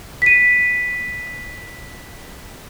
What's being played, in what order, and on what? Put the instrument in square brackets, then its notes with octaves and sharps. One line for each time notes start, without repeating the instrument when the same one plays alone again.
[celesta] B6 D#7